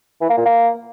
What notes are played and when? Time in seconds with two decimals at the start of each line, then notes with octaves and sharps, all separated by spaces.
0.21 E3
0.29 A#3
0.37 A#2
0.45 A#3